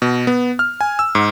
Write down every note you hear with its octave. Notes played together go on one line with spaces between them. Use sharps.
B2
B3
F6
G#5
E6
G#2